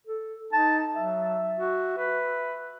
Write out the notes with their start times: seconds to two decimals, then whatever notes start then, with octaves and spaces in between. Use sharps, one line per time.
0.07 A4
0.53 D#4 A5
0.96 F#3 E5
1.59 F#4
1.98 B4